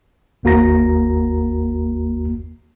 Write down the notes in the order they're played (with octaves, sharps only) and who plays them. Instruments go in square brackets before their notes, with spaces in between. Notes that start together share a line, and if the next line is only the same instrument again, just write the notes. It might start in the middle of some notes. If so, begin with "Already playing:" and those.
[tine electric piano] G1 D#2 A#3 F#4 A#5 A#6